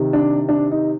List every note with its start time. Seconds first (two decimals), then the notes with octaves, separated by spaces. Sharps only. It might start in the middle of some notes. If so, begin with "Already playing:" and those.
Already playing: C3 D#3
0.13 D4
0.49 D4
0.71 D#4